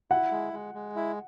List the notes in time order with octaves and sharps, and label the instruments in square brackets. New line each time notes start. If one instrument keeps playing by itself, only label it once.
[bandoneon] E4 [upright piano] F#5
[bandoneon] G#3
G#3
G#3
E4